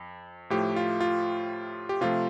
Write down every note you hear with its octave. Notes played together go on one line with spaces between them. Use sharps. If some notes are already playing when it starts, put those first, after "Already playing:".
Already playing: F2
A2 F3 A3 G4
F4
F4
G4
C3 F3 A3 F4